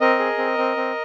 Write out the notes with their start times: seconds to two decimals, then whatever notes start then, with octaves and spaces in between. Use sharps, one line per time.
0.01 C4 A#4 D#5
0.19 G#4
0.38 C4
0.58 C4
0.77 C4